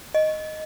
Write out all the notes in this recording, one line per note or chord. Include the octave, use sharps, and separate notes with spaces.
D#5